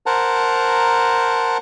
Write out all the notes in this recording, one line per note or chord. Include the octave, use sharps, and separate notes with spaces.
A#4 C5 F#5 A5 A#5